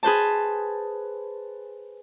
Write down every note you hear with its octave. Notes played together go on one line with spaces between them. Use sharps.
G#4 B4 C5 A5